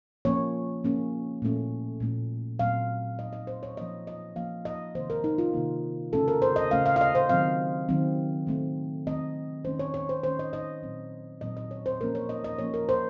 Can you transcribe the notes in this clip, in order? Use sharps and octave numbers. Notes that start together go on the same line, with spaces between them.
F3 A#3 C#4 C#5
F3 A#3 C#4
A#2 A3 C#4
A#2 A3 C#4
A#2 F#3 A3 C4 F5
A#2 F#3 A3 C4 D#5
D#5
C5
C#5
F3 A#3 C#4 D#5
D#5
F3 A#3 C#4 F5
D#5
C3 D#3 A#3 C5
A#4
D#4
F4
C3 D#3 A#3
C#3 A3 C#4 A4
A#4
C5
D#5
C#3 A3 C#4 F5
F5
F5
D#5
C5
D#3 F#3 C4 F5
D#3 F#3 C4
D#3 A3 C4
D#3 A3 C4 D#5
D#3 A3 C#4 C5
C#5
C#5
C5
D#3 A3 C#4 C5
D#5
D#5
A#2 F#3 C4
A#2 F#3 C4 D#5
D#5
C#5
C5
F3 A#3 C#4 A#4
C#5
D#5
D#5
F3 A#3 C#4 C#5
A#4
C5